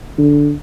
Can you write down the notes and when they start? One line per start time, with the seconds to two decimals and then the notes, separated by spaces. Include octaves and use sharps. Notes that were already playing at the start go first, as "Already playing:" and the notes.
0.18 D3